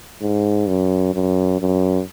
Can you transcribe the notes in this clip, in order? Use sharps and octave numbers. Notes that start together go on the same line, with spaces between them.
G#2
F#2
F#2
F#2